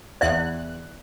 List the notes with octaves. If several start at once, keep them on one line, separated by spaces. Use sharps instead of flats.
E2 D5 E5 F#6